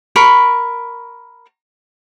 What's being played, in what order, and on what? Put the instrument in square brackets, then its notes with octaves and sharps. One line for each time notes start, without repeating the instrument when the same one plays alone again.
[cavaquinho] A#4 B5 C#6